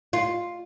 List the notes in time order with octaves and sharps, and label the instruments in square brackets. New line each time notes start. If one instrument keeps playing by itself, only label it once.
[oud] F4